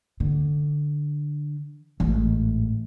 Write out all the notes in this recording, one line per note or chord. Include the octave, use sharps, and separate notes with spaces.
D3
A1 G#2